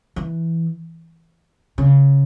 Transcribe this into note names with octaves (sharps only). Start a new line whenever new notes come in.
E3
C#3